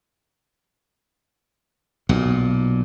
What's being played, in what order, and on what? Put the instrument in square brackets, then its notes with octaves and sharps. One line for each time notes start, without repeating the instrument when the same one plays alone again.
[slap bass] B1 A#2